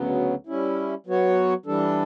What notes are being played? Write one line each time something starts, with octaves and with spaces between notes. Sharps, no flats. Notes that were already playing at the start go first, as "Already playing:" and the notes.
Already playing: D2 C#3 F#3 B3
G3 C#4 E4
F#3 B3 F#4 C#5
E3 G3 D4 A4